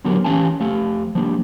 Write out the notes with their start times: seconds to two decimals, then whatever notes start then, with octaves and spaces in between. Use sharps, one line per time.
0.05 D3 F#3 B3 G4 A#4
0.24 E3 C#4 G4 F5 G#5 A5
0.60 F2 A3 G4 F5
1.15 F3 G3 A#3 D4